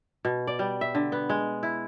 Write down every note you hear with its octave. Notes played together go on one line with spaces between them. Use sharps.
B2
D5
G3
E5
D3
B3
G#3
E4